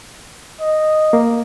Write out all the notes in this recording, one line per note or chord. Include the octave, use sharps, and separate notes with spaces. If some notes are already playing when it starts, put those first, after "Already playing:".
D#5
A#3